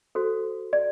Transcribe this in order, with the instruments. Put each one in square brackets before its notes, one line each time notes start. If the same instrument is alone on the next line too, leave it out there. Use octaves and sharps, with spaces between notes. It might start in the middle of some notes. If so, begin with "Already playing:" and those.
[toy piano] F#4 A4 C5
D5